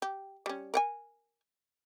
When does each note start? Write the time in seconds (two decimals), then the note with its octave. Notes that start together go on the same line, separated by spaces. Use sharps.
0.02 G4
0.46 G3 C#4
0.74 A#4 F#5 G#5